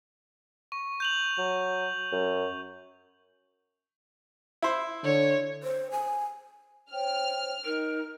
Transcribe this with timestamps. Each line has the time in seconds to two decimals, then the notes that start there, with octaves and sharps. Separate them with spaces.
0.72 C#6
1.00 G6 F7 F#7
1.38 F#3
2.12 F#2
4.62 E4 C5
5.04 D3 C#5
5.63 C5
5.92 G#5
6.93 C5 C#5 G5 F6
7.65 D#4 A#4